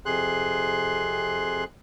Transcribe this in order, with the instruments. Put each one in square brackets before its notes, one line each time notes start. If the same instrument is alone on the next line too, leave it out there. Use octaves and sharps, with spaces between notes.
[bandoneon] F2 C3 G#4 C6 F#6